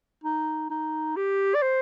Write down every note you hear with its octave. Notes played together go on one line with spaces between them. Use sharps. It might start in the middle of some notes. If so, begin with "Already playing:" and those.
D#4
D#4
G4
D5
C5